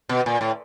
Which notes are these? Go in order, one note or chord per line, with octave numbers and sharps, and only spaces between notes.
B2
A#2
A2